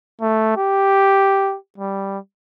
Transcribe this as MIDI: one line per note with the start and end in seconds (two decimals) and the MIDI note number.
0.21 0.52 57
0.57 1.56 67
1.78 2.18 55